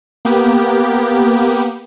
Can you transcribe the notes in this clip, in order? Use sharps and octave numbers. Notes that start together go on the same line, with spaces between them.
A#3 B3 G4